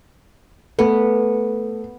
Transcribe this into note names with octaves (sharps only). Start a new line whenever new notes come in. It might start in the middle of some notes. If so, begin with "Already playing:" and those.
A3 B3